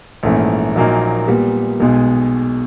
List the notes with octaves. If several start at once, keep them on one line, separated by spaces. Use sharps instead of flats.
A#1 G#2 E3 A3 C#4
A#1 A#2 F#3 A#3 D#4
A#2 G3 B3
B1 B2 G#3